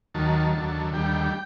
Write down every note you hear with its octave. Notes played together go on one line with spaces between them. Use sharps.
D#2 D#3 F#3 A5
D#2 D3 F#3
D#2 D3 G3 G5